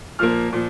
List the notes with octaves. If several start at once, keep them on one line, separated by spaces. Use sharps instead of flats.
A#2 F3 A#3 F6
A#2 F3